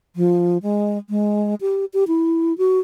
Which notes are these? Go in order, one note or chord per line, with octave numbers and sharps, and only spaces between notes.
F3
G#3
G#3
G4
G4
E4
F#4